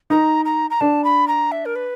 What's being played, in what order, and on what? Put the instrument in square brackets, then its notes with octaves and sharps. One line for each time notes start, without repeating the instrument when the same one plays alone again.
[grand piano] D#4 [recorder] A#5
[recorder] A#5
A#5
[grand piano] D4 [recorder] A5
[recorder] B5
A#5
E5
A#4
B4